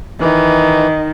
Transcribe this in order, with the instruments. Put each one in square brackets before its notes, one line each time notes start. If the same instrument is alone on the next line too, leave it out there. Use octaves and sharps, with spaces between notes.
[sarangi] D#3 [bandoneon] E3